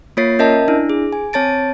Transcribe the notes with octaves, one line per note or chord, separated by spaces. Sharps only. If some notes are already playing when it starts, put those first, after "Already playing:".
A#3 F4 C#5 A6 C7
C#4 A#4 D#5 E5 A5
D4 E4
G#4
G#5
C4 C#5 A5 A6 D7